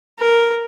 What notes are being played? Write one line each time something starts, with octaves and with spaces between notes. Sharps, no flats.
A#4